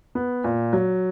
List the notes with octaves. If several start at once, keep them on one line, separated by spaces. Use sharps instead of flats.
B3
A#2
F#3